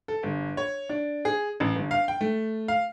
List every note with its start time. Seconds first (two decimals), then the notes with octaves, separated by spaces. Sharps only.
0.08 A4
0.23 G1
0.57 C#5
0.89 D4
1.25 G#4
1.60 A1
1.75 G1
1.91 F5
2.08 G5
2.21 A3
2.68 F5